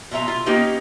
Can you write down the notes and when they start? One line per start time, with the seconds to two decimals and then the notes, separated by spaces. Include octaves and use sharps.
0.11 B2 F4 E5 A#5
0.28 F4
0.46 A#3 B3 C#4 D#4 G4